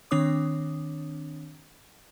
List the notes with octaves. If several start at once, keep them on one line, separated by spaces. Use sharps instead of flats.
D#3 C4 D4 C#5 D6 D#6